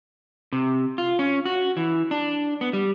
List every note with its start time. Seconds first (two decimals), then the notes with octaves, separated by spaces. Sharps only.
0.53 C3
0.98 F4
1.19 C#4
1.46 F#4
1.77 E3
2.11 D4
2.61 B3
2.73 G3